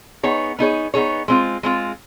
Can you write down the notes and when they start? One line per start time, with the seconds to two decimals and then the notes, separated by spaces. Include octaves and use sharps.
0.23 B3 D#4 G#4 C#5
0.59 B3 D#4 G#4 C#5
0.94 B3 D#4 G#4 C#5
1.28 G#3 C4 F4
1.63 G#3 C4 F4